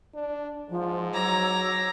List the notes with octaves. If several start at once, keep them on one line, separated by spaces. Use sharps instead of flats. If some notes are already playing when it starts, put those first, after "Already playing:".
D4
G#2 F3
F#3 C#5 A#5 D6 E6